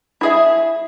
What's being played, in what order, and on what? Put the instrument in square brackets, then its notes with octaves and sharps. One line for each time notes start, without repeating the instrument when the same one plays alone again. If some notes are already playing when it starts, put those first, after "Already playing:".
[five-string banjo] E4 G#4 E5